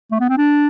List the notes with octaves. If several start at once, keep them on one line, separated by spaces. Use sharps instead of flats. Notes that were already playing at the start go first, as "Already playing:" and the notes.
A3
B3
C4
D4